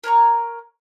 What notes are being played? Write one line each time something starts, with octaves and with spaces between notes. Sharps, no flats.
A#4 C#5 A#5 C#6